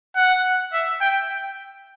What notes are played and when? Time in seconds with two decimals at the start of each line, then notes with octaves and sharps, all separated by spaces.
0.16 F#5
0.73 E5
1.01 G5